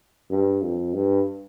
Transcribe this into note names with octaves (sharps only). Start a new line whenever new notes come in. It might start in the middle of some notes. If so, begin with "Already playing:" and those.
G2
F2
G2